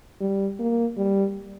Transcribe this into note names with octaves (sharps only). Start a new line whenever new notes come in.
G3
A#3
G3